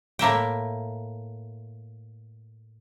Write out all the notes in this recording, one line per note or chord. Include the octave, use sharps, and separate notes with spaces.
A2 A#3 E5 G5